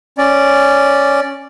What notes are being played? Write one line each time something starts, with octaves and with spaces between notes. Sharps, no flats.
C#4 D5